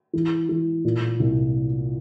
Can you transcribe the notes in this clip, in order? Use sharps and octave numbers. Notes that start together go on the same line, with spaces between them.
E3
E3
A#2
C2